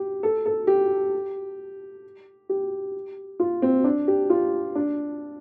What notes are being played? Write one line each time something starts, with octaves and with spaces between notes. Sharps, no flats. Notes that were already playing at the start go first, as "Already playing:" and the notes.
Already playing: G4
A4
A4
G4
G4
F4
C4
D4
G4
F4
D4